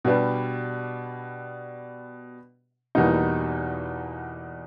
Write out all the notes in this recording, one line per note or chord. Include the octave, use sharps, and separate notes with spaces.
B2 G3 B3 D4 G4
E2 B2 G3 A#3 D#4